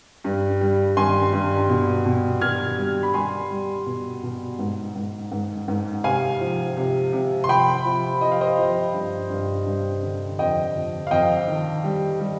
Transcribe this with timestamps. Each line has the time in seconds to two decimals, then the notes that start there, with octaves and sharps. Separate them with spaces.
0.24 G2
0.61 G3
0.97 G2 G#5 C6
1.33 G2
1.69 B2
2.06 B2
2.41 B2 F6 G#6
2.78 G3
3.03 B5
3.14 G3 G#5 C6
3.51 G3
3.86 B2
4.23 B2
4.59 G#2
4.95 G#2
5.32 G#2
5.68 G#2
6.04 C3 F5 G#5
6.40 F3
6.77 C3
7.13 C3
7.44 C6
7.49 F3 G5 B5
7.85 F3
8.21 F3 D#5
8.32 F5
8.41 C5 D#5
8.58 F3
8.94 G2
9.30 G2
9.66 G2
10.03 D3
10.39 F2 D#5 G5
10.76 F2
11.07 F5
11.11 F2 D#5 G5
11.48 D#3
11.84 G3
12.20 G3